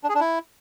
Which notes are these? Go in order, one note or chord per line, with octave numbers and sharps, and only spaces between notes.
D4
G#4
D4
E4